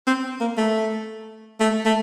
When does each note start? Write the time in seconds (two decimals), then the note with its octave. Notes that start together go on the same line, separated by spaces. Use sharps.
0.07 C4
0.40 A#3
0.57 A3
1.60 A3
1.85 A3